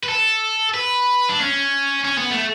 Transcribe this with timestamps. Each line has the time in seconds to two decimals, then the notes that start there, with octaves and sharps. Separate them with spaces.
0.04 B4
0.09 A4
0.74 B4
1.29 D4
1.41 C#4
2.05 C#4
2.18 B3
2.31 A3